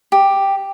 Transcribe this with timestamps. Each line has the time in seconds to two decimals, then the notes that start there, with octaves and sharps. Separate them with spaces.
0.12 G4